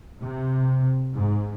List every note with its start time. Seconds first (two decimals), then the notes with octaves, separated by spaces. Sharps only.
0.23 C3
1.15 G#2